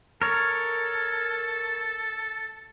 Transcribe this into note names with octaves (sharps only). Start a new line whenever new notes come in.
A4 A#4 C#5